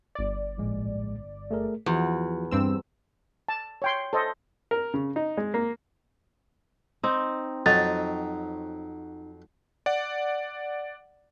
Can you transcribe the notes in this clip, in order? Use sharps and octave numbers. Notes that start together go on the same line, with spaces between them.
G1 D5
A#1 A2 G#3
A3 G#4 A#4
E2 F3 F4 F#4
G2 C4 E6
A5
C#5 G5 C6
A4 C5 D#5
A#4
C#3
D#4
G#3
A#3
C4 D#4
F2 F#3 D#4 A#5 A6
D5 F#5